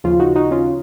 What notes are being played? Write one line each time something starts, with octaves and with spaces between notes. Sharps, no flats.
D#2 C#3 F3 C#4 F4
D#4 F#4
D#4 F#4
C#4 F4